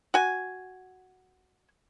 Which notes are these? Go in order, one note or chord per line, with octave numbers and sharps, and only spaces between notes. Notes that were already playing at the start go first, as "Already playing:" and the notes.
F#4 G#5